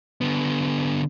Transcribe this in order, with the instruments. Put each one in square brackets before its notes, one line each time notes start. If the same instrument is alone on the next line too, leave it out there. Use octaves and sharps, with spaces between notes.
[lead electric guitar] D3 B3